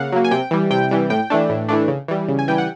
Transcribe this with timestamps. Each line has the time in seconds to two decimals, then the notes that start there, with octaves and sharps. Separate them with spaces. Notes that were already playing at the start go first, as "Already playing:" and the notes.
Already playing: C#3 A#3 F5 F#5
0.12 F#3 A#3
0.24 G#5
0.31 C3 G5
0.51 E3 G3
0.70 C3 G5
0.91 E3 G3
1.10 A2 G5
1.30 E3 A3 D4
1.49 A2
1.69 E3 A3 D4
1.88 C#3
2.08 E3 G3
2.28 C#3
2.39 G#5
2.48 E3 G3 G5
2.58 F#5